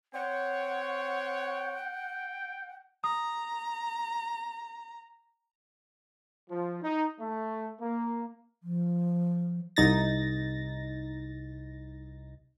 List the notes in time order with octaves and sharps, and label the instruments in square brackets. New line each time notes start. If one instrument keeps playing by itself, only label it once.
[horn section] C4 C5 C#5 [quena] F#5 [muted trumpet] G5
[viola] A#5 [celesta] D#6
[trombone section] F3
D#4
A3
A#3
[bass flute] F3
[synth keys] C2 D#4 A6 A#6